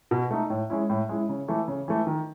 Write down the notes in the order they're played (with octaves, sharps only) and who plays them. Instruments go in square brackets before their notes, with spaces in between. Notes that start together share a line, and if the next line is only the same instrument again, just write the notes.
[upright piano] B2
A3 D#4
A2
G#3 C#4 E4
A2
G#3 C#4 E4
C#3
E3 A3
C#3
E3 A3
D#3